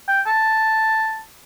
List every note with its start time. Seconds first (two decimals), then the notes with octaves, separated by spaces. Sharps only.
0.08 G5
0.27 A5